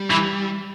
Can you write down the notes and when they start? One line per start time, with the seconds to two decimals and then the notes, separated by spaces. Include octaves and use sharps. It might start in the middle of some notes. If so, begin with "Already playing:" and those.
Already playing: G3
0.11 E3